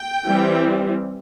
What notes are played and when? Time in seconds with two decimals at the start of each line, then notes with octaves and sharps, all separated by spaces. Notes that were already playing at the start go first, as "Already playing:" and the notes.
Already playing: G5
0.24 E3 G3 C4